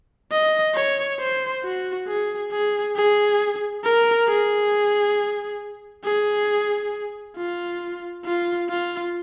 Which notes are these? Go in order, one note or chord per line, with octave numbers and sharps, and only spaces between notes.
D#5
C#5
C5
F#4
G#4
G#4
G#4
A#4
G#4
G#4
F4
F4
F4